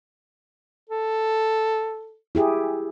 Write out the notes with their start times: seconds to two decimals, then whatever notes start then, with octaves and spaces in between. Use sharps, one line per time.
0.90 A4
2.35 E4 G4 G#4